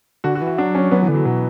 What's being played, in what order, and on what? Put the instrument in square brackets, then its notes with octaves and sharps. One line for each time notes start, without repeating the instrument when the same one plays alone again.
[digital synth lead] D3 [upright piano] F#4
[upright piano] F#4
[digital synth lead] E3
[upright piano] F#4
[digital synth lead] F#3 [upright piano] D4
[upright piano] C#4
[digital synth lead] F#3 [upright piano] B3
[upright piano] E3
[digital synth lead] D3
[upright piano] F#3
[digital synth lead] B2 [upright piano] F#3